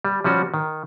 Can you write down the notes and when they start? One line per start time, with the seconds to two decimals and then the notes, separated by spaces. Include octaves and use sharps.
0.05 G3
0.24 F3 G3 C#4 F#4
0.54 D#3